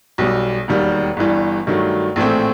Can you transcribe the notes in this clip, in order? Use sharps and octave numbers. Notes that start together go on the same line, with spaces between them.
B1 B2 G3
E1 D#2 D#3 G3
G1 G2 E3 G3
G2 D#3 F#3 A3
A#1 A2 E3 A3 C4